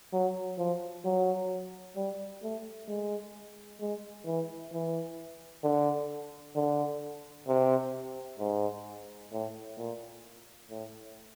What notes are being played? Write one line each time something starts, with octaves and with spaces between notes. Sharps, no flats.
F#3
F3
F#3
G3
A3
G#3
G#3
E3
E3
D3
D3
C3
G#2
A2
A#2
A2